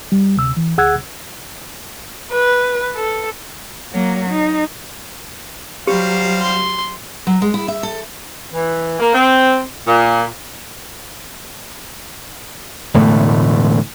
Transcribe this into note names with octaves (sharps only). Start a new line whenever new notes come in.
G3
D2 C3 E6
E3
D2 G#4 F#5 E6 F#6 G#6
B4
A4
F#3 A#3
D#4
F#3 G3 G4 C5 F5
C6
F#3
G#3
E4
E5
A4
E3
A#3
C4
A#2
E1 A2 D3 A3